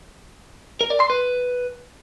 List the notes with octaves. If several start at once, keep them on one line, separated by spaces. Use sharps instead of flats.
A#4
D5
C6
B4